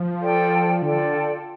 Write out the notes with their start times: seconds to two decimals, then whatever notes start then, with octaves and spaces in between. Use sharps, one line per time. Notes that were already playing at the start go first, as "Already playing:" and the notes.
Already playing: F3
0.21 F4 A4 D5 G5
0.82 D3 F4 A4 D5 G5